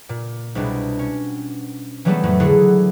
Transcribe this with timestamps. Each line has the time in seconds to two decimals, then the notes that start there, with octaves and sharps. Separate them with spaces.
0.09 A#2
0.55 C2 B2 D4
0.99 C#4
2.05 E3 F#3 G3 A3 B3 A4
2.23 F2 A2 A3 B3
2.40 D3 F#3 E4 G#4 A4